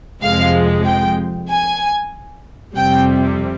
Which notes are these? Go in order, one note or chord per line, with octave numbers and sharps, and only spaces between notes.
F2 C3 F3 G#3 F5
G5
G#5
F2 C3 G3 G5